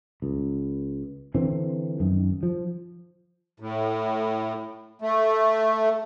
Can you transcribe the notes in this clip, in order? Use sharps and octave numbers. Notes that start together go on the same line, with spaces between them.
C#2
D3 E3 C4
F#2 D#3
F3
A2
A3